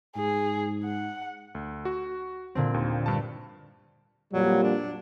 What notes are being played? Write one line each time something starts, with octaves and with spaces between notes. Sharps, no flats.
G#2 G#4
F#5
D2
F#4
A#2 D3 C4
D#2
G2 A5
F2 A#2 F#3 G3
D4